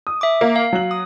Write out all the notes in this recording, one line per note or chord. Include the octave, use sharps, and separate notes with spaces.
D#6
E5 D6
A#3
F5
F#3 F#7
D#6